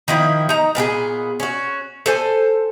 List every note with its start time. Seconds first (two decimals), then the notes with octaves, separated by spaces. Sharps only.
0.08 D#3 F3 E4
0.49 D#4 A#5
0.75 A#2 B3 G4 G#4
1.40 C#4 F#4
2.06 A4 C5 G#5